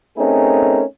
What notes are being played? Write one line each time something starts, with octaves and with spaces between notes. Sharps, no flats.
A3 C4 C#4 D#4 G#4 A#4